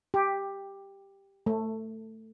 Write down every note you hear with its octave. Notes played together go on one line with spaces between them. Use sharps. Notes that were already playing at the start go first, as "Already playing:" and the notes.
G4
A3